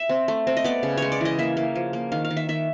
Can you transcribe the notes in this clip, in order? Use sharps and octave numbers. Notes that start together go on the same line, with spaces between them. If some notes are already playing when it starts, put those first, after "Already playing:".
Already playing: E5
C4
A3
C4
D#5
B3 D5
C#3
G#3 C#5
D5
E3 D#5
A#3 E5
A#3
F3
A#3
D#3 F5
F5
D#3
E5
D#3 E5